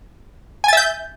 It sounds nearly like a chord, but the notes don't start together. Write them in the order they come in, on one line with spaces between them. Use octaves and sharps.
G#5 A6 E5 G6